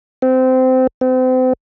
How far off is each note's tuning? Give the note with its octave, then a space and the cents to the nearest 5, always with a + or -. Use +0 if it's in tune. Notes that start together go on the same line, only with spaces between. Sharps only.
C4 -20
C4 -35